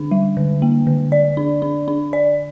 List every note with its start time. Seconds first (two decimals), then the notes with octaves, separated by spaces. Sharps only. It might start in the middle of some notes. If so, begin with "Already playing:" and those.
Already playing: D3 D4
0.11 G3
0.37 D3
0.62 A#3
0.87 D3
1.12 D5
1.37 D4
1.62 D4
1.88 D4
2.13 D5